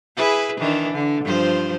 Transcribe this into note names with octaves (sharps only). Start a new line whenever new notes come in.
E4 G#4 B4
D#3 E3 D4
D3
G2 F3 C5